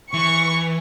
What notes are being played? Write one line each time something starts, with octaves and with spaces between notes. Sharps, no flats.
E3 C#6